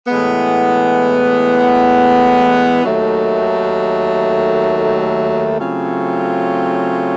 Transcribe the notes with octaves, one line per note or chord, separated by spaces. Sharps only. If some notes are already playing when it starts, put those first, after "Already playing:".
A2 E3 G#3 B3
D#2 D#3 F#3 A3
C#3 F#3 A3 C4 F4